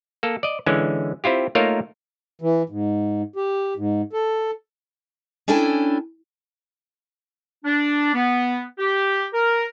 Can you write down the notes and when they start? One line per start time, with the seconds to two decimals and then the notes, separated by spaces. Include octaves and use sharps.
0.23 A#3 A4
0.43 D5 D#5
0.66 D3 E3 G#3 C#4
1.24 C4 E4 F4 G4
1.55 A3 A#3 D#4 F4 A#4 C#5
2.41 E3
2.69 G#2
3.36 G4
3.77 G#2
4.13 A4
5.48 C#4 D4 E4 A4 G5 G#5
7.65 D4
8.14 B3
8.79 G4
9.34 A#4